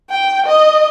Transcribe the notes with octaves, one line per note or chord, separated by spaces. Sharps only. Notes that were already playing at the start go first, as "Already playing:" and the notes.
G5
D#5